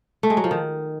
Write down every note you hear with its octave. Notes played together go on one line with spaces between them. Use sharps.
A3
G#3
F#3
F3
D#3